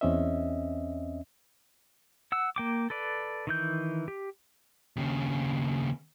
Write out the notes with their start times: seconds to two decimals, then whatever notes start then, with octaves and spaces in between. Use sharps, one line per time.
0.01 E2 C4 C#4 D#5 E5
2.32 F#5 E6
2.56 A#3 G5 D6
2.90 A4 B4 D5
3.47 D#3 E3 G6
4.08 G4
4.97 D#2 C#3